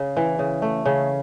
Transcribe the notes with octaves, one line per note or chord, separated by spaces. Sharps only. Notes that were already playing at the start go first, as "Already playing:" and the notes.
Already playing: C#3
E3
C#3
A3
C#3